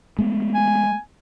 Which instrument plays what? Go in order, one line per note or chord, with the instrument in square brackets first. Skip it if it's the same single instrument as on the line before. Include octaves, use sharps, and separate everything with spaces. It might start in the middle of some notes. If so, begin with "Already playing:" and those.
[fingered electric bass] G#3 A3 B3
[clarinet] G#5